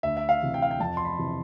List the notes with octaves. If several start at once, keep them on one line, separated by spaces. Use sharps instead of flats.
D2 E5
E5
F5
C3 E3
G5
F5
G5
F2 A5
C6
B5
C3 E3